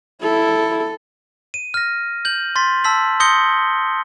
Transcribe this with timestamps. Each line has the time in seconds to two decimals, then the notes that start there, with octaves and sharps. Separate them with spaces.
0.22 E4 A4
1.54 D#7
1.74 F6 A#6
2.25 G6 F#7
2.56 C6 A6 B6
2.84 A5 E6 B6 F#7
3.20 C6 D#6 G6 A#6 C#7 G7